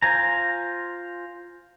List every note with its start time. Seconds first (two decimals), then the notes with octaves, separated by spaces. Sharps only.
0.02 F4 C5 G#5 A#5